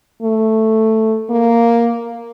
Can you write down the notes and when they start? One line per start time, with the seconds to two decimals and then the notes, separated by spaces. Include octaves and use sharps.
0.23 A3
1.30 A#3